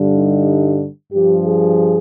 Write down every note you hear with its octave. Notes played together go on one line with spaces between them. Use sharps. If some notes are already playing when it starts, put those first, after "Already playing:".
Already playing: G2 D3 G3
D#4
G2 F3 G4
G#4